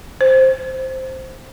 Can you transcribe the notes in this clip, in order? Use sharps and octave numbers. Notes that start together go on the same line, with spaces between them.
C5